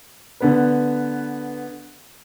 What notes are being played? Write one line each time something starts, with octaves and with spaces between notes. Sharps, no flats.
D3 B3 B4